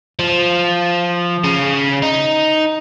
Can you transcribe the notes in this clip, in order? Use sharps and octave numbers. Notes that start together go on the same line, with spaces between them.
F3
C#3
D#4